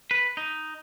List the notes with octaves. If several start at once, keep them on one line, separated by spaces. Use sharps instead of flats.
B4
D#4